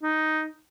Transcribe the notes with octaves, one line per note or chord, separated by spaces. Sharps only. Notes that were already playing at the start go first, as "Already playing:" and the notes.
D#4